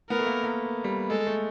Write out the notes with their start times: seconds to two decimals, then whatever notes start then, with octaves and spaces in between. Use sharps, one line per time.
0.10 B3 A#4
0.19 A3
0.27 A#3
0.44 A#3
0.84 G3
1.10 G#3 A4
1.27 A3